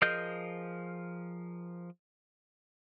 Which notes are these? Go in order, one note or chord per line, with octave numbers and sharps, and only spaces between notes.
F3 G#4 A#4 D#5 G6